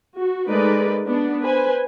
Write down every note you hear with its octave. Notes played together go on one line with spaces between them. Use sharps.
F#4
G#3 A3 D#4 A#4 B4 D5
B3 D4
B4 C5 G#5